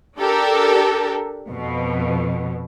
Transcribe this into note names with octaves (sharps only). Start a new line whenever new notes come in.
D4 G4 A4 A#4
F2 B2